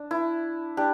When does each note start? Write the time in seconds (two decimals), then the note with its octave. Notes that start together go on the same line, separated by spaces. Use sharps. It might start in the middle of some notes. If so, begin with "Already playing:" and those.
Already playing: D4
0.11 E4
0.77 D4 G4